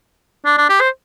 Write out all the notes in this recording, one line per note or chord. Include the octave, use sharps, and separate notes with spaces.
D4
D4
G4
C5